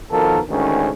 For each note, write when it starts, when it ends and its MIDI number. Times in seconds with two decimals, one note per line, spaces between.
0.12 0.40 47
0.12 0.40 51
0.12 0.40 53
0.12 0.40 69
0.12 0.40 70
0.50 0.89 38
0.50 0.89 44
0.50 0.89 51
0.50 0.89 61